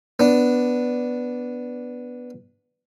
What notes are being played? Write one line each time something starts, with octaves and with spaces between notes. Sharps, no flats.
B3 D4